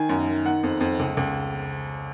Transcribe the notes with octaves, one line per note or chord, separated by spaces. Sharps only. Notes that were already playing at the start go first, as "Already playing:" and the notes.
Already playing: D#3 G#5
F#2
D#3
D#3 F#5
F2
F2
C#2
C#2